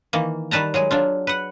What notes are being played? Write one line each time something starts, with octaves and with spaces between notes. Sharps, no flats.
D#3 E3 A#3
D#3 G3 B4 A5 A#5
F#3 G#3 G#4
F#3 D4 F4
B4 F#5